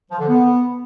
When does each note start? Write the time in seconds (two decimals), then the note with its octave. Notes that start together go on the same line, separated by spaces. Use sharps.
0.10 F3
0.19 D3
0.28 B3